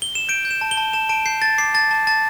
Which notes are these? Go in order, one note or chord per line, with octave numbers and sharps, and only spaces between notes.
G7
E7
G6 D7
G6
E7
A5
G7
A5
A5 E7
A5 D7
G6 C7
A5 A6
D6 C7
A5 A6
A5
A5 A6